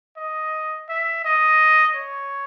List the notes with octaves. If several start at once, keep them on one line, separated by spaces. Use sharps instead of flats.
D#5
E5
D#5
C#5